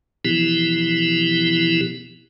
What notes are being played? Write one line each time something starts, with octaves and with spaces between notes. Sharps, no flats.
B2 E3 F3 B3 E4 G4